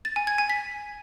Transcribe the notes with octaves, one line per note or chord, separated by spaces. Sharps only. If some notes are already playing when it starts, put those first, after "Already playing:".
A6
G#5
G#6
G#5
B6